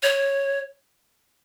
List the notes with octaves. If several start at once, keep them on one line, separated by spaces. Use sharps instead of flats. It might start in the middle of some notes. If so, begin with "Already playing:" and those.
C#5